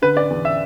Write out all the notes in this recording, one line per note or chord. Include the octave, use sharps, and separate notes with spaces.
D3 B4
D5
E2
E5